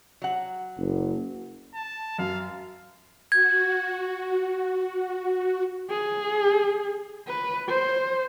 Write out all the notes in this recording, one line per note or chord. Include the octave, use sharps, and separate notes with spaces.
F#3 F#5
F#1
A5
F#2 F5
F#4 G#6
G#4
B4
C5